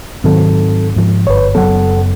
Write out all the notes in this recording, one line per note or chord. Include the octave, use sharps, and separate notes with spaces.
G#2 D#3 F#3 C4 A4
G#2 F3
G1 B4 C#5
F#1 F#3 B3 A4 F#5